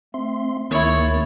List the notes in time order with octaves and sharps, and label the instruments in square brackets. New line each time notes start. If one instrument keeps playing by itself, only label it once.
[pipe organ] A3 [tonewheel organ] C4 E5 C6
[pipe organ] D2 A6 [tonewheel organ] D#3 A#3 [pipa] G#3 E4 [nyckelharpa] C#5